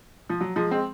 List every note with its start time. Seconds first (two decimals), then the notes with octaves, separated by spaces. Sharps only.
0.29 F3
0.40 F#3
0.56 F3 G#3
0.71 G#3 C4